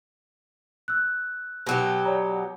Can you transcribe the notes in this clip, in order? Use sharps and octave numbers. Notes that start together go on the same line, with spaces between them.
E6 F#6
B2 F#3 G4
C#5 D5 A#5